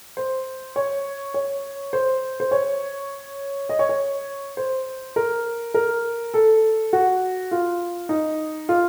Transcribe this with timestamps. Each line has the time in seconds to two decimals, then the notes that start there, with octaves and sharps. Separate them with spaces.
0.17 C5
0.76 C#5
1.34 C#5
1.93 C5
2.40 C5
2.51 C#5
3.69 D#5
3.79 C#5
3.89 C#5
4.57 C5
5.16 A#4
5.74 A#4
6.34 A4
6.93 F#4
7.51 F4
8.09 D#4
8.69 F4